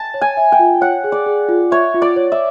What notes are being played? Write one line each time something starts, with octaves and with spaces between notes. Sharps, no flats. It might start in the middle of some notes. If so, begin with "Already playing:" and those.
Already playing: A5
C#5
G#5
E5
G5
F4
C#5 F#5
G#4
D5
G#4
F4
C#5 E5
F4
D5
C#5
E5